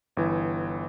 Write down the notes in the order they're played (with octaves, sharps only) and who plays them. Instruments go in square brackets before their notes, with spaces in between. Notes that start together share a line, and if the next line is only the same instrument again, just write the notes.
[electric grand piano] G1 E3